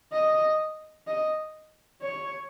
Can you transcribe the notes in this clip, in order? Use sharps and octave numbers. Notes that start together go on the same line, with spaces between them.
D#5
D#5
C#5